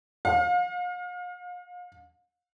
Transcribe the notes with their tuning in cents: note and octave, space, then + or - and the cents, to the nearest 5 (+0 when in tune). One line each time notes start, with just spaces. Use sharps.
F5 +35